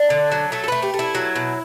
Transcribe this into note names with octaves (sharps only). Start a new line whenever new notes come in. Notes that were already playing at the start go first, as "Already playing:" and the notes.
Already playing: D4
D3
F#3
A3 A4
A4
A3 B4
G4
A3
E4
F#3
B2